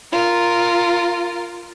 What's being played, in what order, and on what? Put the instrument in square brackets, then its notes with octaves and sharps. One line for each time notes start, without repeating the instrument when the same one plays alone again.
[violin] F4 A#4